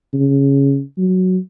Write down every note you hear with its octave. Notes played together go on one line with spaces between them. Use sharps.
C#3
F#3